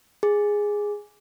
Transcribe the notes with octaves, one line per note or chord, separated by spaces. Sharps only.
G#4